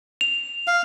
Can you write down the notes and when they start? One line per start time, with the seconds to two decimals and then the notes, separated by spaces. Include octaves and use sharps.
0.21 F7
0.67 F5